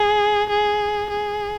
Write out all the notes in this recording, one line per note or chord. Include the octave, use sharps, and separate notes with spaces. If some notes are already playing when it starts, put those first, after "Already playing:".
Already playing: G#4
G#4
G#4